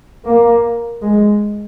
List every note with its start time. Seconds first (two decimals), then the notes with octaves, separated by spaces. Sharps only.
0.25 A#3
1.02 G#3